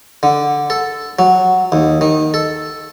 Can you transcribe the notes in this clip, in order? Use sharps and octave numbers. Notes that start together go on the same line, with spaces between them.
D3
A4
F#3
D#2
D#3
A4